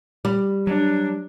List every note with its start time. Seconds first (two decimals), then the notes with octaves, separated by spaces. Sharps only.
0.25 G3
0.67 F#3 D4